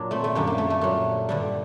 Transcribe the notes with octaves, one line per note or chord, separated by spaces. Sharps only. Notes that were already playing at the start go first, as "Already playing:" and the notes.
Already playing: A#2 F#3 D4
A3 C4
A3
F#2 D3 G3 A#3
A#3
A3
A3
A#2 F#3
G2 D3 G3